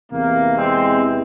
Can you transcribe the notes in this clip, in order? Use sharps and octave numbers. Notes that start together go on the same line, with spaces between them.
E2 C3 E3 A#3
G#3 C4